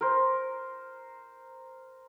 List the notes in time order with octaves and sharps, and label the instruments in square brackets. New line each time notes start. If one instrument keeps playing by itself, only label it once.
[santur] A#4 C5